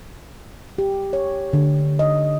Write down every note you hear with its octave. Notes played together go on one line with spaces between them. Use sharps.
G4
C#5
D3
D#5